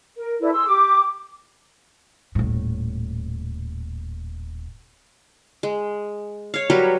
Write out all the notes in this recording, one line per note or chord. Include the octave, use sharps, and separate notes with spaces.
A#4
E4 A4 B4 D5
G#4 C6 E6
G4 D6
D#1 A2
G#3
C#5 F5
F#3 G3 A#4 B4